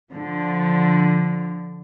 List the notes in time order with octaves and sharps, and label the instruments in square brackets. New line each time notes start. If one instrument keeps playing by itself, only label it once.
[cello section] D3 F3